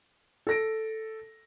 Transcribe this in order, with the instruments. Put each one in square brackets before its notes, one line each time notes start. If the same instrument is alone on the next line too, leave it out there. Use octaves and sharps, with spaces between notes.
[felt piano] A4 A#6 D7